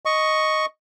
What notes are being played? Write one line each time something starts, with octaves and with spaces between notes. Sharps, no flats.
D#5 C#6